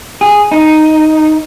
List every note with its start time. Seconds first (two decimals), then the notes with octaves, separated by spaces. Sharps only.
0.21 G#4
0.52 D#4